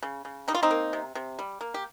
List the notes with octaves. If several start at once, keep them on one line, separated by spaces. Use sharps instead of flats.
C#3
C#3
G3 D#4
F4
C4 D#4
A#3
C3
C3
G3
A#3
G4